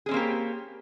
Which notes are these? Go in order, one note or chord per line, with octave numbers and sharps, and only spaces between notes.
A#3 C4 C#4 G4 G#4